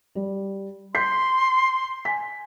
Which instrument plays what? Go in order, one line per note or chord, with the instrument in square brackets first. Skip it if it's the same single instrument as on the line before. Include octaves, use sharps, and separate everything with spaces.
[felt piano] G3
[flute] C6 [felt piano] G6 B6 C7
[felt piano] G#5 B6